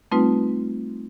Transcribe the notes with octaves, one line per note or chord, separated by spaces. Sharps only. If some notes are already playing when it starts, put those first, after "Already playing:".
G3 A3 C4 D#4 F4 B4